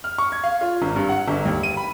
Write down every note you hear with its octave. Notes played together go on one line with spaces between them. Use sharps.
F6
C#6
G#6
F5
F4
G#1
G2
F#5
G1
D#2
D#7
B5